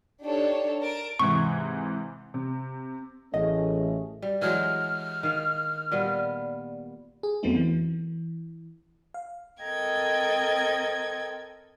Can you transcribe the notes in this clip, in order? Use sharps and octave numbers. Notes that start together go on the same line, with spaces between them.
D4 D#4 G4 A4 C#5
A#4 A5 D7
G#2 C3 E3 C#6
C3
A1 A3 C#4 G#4 D#5
G3
E3 F#3 G#3 F6
D#3 F5
A#2 G3 B3
G#4
F2 F#3 A3 B3 C4 D#4
E3
F5
C4 A4 A#4 D#5 G5 G#6